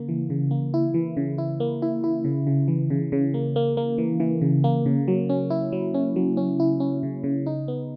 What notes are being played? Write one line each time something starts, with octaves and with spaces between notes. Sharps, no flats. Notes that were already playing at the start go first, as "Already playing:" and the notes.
Already playing: C#3 A#3
E3
C#3
A#3
E4
E3
C#3
E4
A#3
E4
E4
C#3
C#3
E3
C#3
C#3
A#3
A#3
A#3
E3
E3
C#3
A#3
C#3
F#3
C#4
E4
F#3
C#4
F#3
C#4
E4
C#4
C#3
C#3
D#4
B3